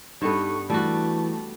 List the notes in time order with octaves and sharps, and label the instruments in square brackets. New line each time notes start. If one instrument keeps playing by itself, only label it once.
[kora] G2 B3 B4 [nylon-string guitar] D#4 G4 A4 [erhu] C#6
[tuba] E3 [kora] G3 F#4 [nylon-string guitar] A3 [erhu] A5